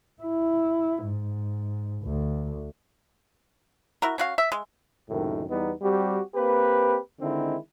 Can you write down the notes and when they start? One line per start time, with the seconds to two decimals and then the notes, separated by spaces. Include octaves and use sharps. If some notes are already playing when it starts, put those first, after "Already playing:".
0.22 E4
1.04 G#2
2.02 D2
4.02 E4 F#4 A#4
4.18 C#4 F#4 F5
4.38 E5
4.52 G#3
5.09 C#2 F#2 A2 C3 D#3
5.49 E2 G3 B3 D#4
5.82 G3 C4 F#4 G4
6.35 A#3 C4 G4 B4
7.20 D3 D#3 G#3 C4 D#4 E4